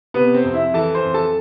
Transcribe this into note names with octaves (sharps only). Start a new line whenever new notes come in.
C3 B3 B4
C4 C5
F2
E4 E5
E3 A4 A5
C5 C6
F2
A4 A5